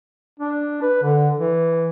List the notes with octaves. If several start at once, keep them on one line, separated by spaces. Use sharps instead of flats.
D4
B4
D3
E3